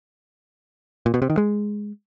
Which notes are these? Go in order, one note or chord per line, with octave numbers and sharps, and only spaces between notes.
A#2
B2
C3
D#3
G#3